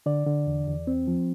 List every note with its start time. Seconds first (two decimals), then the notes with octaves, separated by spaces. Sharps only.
0.06 D3 D5
0.27 D3
0.47 E2
0.67 E2
0.87 C4
1.07 F3